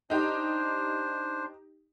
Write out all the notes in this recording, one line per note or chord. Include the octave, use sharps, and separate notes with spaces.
D4 D#4 G4 C5